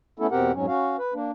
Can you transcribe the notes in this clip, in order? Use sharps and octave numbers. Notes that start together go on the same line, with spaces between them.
A3 B3 C#4 E4 A4
E2 B2 C4 G4 A#4 F#5
F2 G#2 F#3 C#4
C#4 F#4 F5
B4
A#3 D4